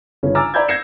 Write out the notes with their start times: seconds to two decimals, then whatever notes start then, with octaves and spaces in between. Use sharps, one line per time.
0.23 G1 C#3 C#4
0.35 G#5 A#5 D6 E6 F6 A6
0.54 D5 A#5 B5 G6 G#6
0.68 G6 G#6 A#6 C7 C#7 E7